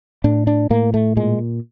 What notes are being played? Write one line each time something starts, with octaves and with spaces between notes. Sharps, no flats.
A2 D4
D4
A2 A#3
A3
A#2 G#3